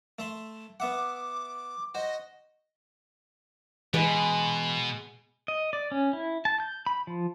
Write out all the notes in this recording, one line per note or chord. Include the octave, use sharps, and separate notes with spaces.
A3 E5 C6
B3 E5 F#5 D6
F#4 C5 D#5
B2 E3 G#3 B4
D#5
D5
C#4
E4
A5
G6
B5
F3